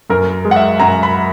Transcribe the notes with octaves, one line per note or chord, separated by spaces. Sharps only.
F#2 A#4
G#3
F#5
E5
F#2 A#5
B5